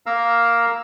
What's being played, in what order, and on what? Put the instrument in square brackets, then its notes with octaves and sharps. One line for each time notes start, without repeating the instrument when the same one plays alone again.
[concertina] A#3 A#4 F5 A#5 E6